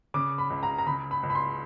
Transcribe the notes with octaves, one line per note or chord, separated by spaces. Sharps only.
C#3 D6
B5
C#2
A#5
A#5
C#3 B5
B5
C#2
B5
C6